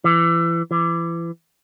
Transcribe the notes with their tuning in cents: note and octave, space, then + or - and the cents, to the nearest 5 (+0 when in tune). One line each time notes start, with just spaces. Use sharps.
E3 +25
E3 +30